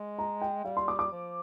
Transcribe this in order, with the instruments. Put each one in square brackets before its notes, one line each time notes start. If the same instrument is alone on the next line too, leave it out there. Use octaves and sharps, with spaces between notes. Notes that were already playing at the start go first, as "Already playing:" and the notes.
Already playing: [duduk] G#3
[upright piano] A#5
G5
[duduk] G3 [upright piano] F5
[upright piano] C6
D6
D6
[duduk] F3